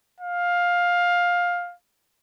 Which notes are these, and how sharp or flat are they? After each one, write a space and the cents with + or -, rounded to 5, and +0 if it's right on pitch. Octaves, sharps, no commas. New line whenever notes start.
F5 +15